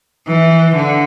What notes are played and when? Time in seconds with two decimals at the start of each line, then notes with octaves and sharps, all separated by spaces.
0.27 E3
0.76 D3